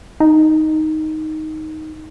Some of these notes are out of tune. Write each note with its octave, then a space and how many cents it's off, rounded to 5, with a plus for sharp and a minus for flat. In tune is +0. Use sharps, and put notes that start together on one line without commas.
D#4 +5